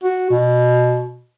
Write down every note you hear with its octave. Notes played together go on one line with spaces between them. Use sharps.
F#4
B2